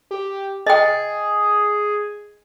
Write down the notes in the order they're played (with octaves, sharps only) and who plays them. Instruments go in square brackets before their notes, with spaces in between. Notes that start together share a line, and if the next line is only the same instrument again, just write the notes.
[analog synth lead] G4
[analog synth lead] G#4 [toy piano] D#5 G5